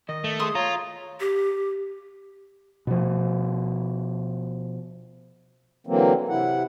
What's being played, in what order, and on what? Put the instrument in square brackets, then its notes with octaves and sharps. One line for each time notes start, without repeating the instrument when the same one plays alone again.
[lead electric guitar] D#3 [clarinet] D#5
[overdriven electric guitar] A3
[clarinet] G#4 [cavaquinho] C6 D#6
[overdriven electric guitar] F4 [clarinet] C#5 [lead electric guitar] A#5
[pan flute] G4
[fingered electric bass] B2 F3
[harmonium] D3 E3 F#3 A#3 C4
C3 E4 F#5